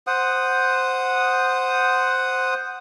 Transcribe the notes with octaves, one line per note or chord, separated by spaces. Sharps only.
C5 F#5 D#6